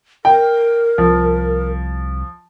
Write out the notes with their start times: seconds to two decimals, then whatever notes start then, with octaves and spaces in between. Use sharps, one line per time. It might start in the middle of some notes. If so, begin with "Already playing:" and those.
0.25 A#4 G5
0.98 C2 F3